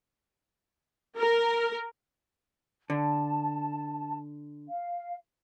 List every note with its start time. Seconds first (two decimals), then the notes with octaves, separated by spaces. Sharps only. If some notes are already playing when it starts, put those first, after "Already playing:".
1.17 A#4
2.90 D3 A5
4.69 F5